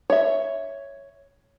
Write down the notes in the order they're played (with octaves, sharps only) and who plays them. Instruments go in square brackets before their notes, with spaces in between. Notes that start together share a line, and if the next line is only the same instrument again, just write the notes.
[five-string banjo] C#5 E5